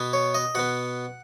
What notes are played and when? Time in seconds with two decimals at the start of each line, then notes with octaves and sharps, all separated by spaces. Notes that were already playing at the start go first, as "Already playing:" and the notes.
Already playing: B2 B3
0.13 C#5
0.34 D#5
0.55 B2 B3 F#5